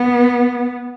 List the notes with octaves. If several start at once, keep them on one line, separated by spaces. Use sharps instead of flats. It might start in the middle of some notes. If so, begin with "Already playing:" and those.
Already playing: B3